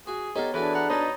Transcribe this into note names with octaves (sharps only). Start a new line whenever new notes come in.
F#4 G#4
B3 D#4 G4 A4 C#5
E3 D4 F#4 G#4 A4 B4
F#5 A#5 B5
B2 D#4 C#5 A#5 A6